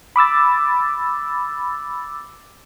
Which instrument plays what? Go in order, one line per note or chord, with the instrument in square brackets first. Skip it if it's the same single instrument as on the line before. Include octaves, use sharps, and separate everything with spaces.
[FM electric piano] B5 D6 E6 A6